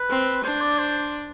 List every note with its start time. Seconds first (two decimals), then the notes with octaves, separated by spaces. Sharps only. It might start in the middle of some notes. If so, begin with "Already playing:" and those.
Already playing: B4
0.10 C4
0.44 D4 C5
0.61 D5
0.79 C5